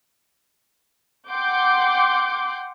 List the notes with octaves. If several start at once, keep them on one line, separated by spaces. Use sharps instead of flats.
F#5 G5 C6 D6 G6